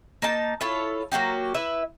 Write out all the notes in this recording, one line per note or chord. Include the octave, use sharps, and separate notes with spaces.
A#3 D#4 A5
E4 F4 A4 C#5
F#3 A#3 F#4 G4
E4 B4 E5